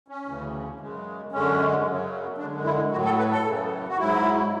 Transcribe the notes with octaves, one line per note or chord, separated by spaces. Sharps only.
C#4
D2 C#3 E3
F#2 C#3 G#3
F#2 D3 G#3 C#4
F#2 C#3 F#3
F#2 D3 G#3 D4
E4
A2 F#3 F#4
A4
B4
A4
F#2 C#3 E3
F#4
G#2 F#3 E4